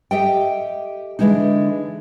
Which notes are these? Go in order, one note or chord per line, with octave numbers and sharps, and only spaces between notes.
G4 A4 D#5 E5 G5
D3 E3 F3 G#3 A#3 D#4